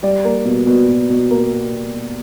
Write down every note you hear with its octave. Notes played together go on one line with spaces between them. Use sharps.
G3 D5
A#3
B2
B2
B2
B2
A#3